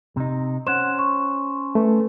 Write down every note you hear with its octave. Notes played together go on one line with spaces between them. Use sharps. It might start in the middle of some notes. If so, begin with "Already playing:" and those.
C3 D#4
C#4 C5 F#5 F#6 E7
C#6
A3 B4